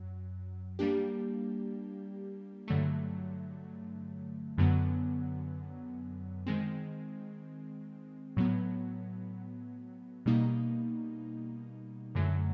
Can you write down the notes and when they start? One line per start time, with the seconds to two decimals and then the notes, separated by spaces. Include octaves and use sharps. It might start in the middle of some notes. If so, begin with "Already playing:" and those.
Already playing: F#2 F#3
0.79 G3 A#3 D4 G4
2.68 G2 D3 F#3 A3
4.58 F#2 D3 F#3 B3
6.46 D#3 G#3 C4
8.37 A2 F#3 B3
10.26 B2 G3 A#3 D#4
12.15 F#2 D3 F#3 A3